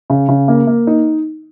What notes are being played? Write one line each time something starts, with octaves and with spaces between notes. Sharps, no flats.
C#3
C#3
A#3
A#3
D#4